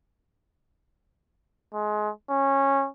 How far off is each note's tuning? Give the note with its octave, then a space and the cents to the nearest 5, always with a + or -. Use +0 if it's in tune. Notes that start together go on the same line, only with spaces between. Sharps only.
G#3 +25
C#4 -15